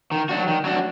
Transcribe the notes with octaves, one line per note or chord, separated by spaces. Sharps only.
D#3
F#3 D4 F#4
D#3
F#3 D4 F#4